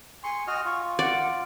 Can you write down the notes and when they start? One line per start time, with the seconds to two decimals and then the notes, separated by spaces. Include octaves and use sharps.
0.24 G#5 C6 C#6
0.48 F#4 D#5 F6
0.65 F4 C#6
0.99 D5 F#5